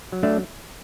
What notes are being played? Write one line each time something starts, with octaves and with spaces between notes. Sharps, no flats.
F#3
A3 D4